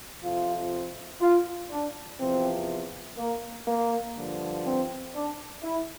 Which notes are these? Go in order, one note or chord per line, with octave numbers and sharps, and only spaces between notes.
F2 C3 F3 F4
F4
D4
E2 C3 F3 C4
A#3
A#3
G2 D3 F3
C4
D4
E4